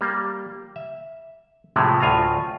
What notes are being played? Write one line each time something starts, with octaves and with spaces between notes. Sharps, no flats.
G3 A#3
E5
A2 C3 F3 G#3 A3
D2 A2 F4 G#5 A#5